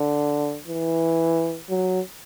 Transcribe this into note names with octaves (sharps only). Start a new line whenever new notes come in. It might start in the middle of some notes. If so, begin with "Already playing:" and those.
Already playing: D3
E3
F#3